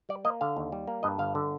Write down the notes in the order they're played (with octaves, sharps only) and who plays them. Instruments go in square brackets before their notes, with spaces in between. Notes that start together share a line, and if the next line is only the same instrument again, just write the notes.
[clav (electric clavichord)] G3 D5
A#3 D#5
D3 F5
D#2
G3
A#3
G2 D#5
G1 F5
D3